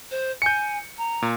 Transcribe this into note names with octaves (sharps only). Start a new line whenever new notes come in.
C5
G#5 G6 C#7
A#5
A#2